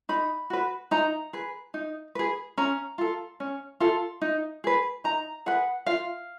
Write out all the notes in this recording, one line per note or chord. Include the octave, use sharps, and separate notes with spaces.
D#4 B5
F#4 B4
D#4 A#5
G#4 B4
D#4
G#4 B4
C#4 A#5
F4 A4
C#4
F4 A4
D#4
G#4 B4
D#4 A#5
G#4 B4 F#5
F4 F5